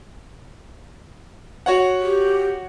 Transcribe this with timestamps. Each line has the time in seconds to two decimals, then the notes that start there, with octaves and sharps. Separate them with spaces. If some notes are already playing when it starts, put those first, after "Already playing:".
1.66 F#4 C#5 F#5
2.01 G4